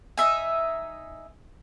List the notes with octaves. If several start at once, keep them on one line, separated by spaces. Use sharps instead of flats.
D#4 E5 G#5